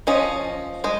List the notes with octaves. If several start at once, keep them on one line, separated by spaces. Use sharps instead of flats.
F3 C#4 D#5
G#3 D#5